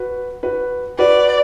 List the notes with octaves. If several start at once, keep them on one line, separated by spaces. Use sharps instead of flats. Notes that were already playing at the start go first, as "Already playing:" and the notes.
Already playing: F#4 B4
F#4 B4
F#4 B4 D5